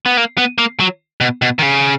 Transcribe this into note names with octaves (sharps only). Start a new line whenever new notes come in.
B3
A#3
B3
A#3
F#3
B2
B2
D#3
C#3